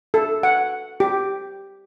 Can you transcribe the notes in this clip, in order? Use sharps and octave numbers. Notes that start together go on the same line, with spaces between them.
A4
F#5
G4